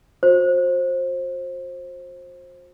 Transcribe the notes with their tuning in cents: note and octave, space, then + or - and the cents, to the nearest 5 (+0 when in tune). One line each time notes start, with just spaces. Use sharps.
F#4 -40 C5 +20